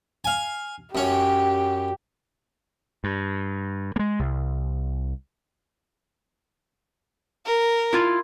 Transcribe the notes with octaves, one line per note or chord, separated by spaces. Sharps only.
F5 G#5
F#2 C#4 G4
G2
G#3 A#3
C2
A#4
E4 F4